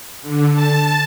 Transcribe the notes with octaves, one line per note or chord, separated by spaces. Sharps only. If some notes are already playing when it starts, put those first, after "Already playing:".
D3
A5